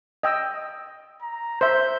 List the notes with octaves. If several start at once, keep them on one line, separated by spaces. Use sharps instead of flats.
D#5 G5 E6
A#5
C5 E5 G6